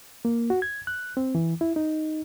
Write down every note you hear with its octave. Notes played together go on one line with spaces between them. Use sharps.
A#3
F#4
G#6
F#6
C4
E3
E4
D#4